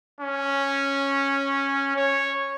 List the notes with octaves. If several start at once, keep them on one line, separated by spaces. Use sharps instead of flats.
C#4
C#5